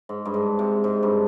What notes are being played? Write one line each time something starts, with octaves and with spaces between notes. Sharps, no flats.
G#2
G2
G#2
C3
G#2
G2